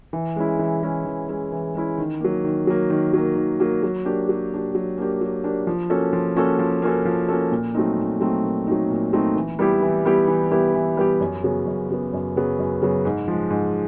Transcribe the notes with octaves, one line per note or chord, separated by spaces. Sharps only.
E3
G#3 C#4 E4
E3
G#3 C#4 E4
E3
G#3 C#4 E4
E3
G#3 C#4 E4
D#3
F#3 A#3
D#3
F#3 A#3
D#3
F#3 A#3
D#3
F#3 A#3
F#3
A#3 D4 G4
F#3
A#3 D4 G4
F#3
A#3 D4 G4
F#3
A#3 D4 G4
F3
A#3 C#4 F#4 A4
F3
A#3 C#4 F#4 A4
F3
A#3 C#4 F#4 A4
F3
A#3 C#4 F#4 A4
A#2
F#3 A3 C4 D#4
A#2
F#3 A3 C4 D#4
A#2
F#3 A3 C4 D#4
A#2
F#3 A3 C4 D#4
E3
G3 B3 E4 G4
E3
G3 B3 E4 G4
E3
G3 B3 E4 G4
E3
G3 B3 E4 G4
F#2
C#3 F#3 B3
F#2
C#3 F#3 B3
F#2
C#3 F#3 B3
F#2
C#3 F#3 B3
G#2
F3 G#3
G#2